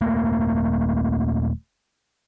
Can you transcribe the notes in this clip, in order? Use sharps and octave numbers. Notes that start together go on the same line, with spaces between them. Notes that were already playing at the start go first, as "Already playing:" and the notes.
D#1 A3 A#3